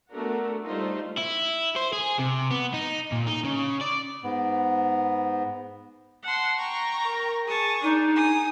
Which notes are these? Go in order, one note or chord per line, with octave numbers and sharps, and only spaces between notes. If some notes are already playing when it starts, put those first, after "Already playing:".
A3 B3 D4 F#4 A#4
G3 A3 D#4 F4 C5
E4
C5
G#4
C3
B3
D#4
A#2
D#4
C#3
D5
G#2 B3
F#5 A5 C6
G5 A#5 C#6
A#4
G#4 A5 C#6 D#6
D4 D#4
G#5 D#6